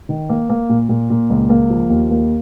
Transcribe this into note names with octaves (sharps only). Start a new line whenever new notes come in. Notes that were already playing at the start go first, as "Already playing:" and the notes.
D#3
A#3
A#3
A#2
A#2
A#2
C#2
A#3
F3
D#2
A#3